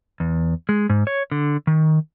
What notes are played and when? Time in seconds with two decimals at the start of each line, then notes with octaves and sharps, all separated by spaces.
0.20 E2
0.69 G#3
0.90 G#2
1.07 C#5
1.32 D3
1.67 D#3